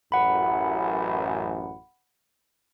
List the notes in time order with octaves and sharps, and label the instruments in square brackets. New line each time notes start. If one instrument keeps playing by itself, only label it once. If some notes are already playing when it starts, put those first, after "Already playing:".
[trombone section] A1 F#2 [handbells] F#5 B5